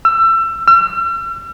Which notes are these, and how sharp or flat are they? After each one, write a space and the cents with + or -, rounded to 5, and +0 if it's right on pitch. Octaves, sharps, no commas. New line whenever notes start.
E6 +25
E6 +45